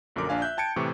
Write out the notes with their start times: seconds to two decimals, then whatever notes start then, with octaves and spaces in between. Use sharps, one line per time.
0.16 A#1 F#2 D3 A#4 D6
0.29 A#1 D4 F5 G#5
0.42 E5 F#6 G6
0.57 G5 A5 G#6 C#7 D7
0.76 A2 C3 E3 C#6 D6